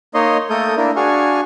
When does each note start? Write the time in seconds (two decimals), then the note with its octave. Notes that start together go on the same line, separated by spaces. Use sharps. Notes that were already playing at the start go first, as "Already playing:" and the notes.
0.14 A#3 D#4 C#5 D#5 C6
0.50 A3 A#3 A4 A#4 D#6 G6
0.76 A#3 D4 E4 A#4
0.96 D4 F#4 G#4 F5 G#5 C#6